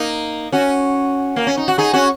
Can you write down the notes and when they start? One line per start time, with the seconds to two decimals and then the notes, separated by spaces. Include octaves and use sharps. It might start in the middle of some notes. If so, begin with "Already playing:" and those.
Already playing: A#3 D#4
0.52 C#4 F#4
1.36 A#3
1.47 C#4
1.57 D#4
1.68 F#4
1.78 D#4 G#4
1.93 C#4 F#4